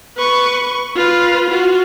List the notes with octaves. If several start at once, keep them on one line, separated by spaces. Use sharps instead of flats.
B4 C#6
F4 B4
F4 F#4